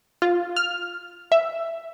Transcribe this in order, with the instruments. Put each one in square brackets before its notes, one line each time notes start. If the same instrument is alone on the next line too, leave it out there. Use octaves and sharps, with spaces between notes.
[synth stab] F4
F6
E5